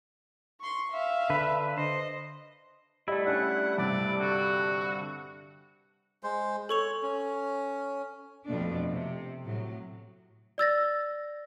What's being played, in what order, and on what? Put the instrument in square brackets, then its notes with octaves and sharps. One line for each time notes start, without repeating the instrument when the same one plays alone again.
[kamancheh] C6 C#6
E5 F5
[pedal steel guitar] D3 B4
[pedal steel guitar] C5 [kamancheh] D#5
[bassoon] G3 [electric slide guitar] A3 E4 [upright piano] D#5
[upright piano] C#4 D4 [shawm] F#5
[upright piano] G2 C3 [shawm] D5
[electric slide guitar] D3 [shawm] F#4
[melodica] G#3 C5
[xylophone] A4 C#6 F7 [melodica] C#5
[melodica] C#4
[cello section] F2 B2 A3 D4
C3
A2 F#3
[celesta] D5 E6 A6 A#6